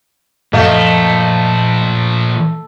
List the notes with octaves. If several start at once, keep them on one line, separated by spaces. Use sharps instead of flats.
F#2 A#2 F3 A3 D#5 F5